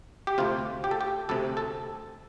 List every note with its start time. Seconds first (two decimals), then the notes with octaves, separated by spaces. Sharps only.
0.27 G4
0.38 D2 C3 F4
0.84 G4
0.91 A4
1.01 G4
1.29 D2 C3 A4
1.57 A4